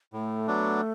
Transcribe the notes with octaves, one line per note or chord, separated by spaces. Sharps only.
A2 A3
F#3 B3 D4